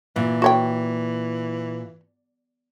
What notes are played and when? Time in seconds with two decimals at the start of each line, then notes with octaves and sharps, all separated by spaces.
0.16 A#2 E3
0.42 F#4 C#5 G5